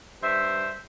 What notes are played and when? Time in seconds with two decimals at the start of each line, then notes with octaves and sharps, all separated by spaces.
0.22 G2 C5 E5